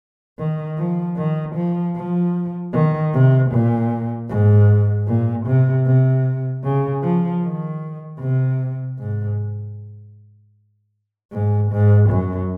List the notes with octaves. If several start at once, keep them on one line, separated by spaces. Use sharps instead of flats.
D#3
F3
D#3
F3
F3
D#3
C3
A#2
G#2
A#2
C3
C3
C#3
F3
D#3
C3
G#2
G#2
G#2
F#2